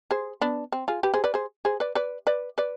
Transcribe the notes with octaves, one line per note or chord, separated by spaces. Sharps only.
G#4 C5
B3 D4
C4
F4 G#4
G4 B4
G#4 C5
B4 D5
G#4 C5
G#4 C5
B4 D5
B4 D5
B4 D5
B4 D5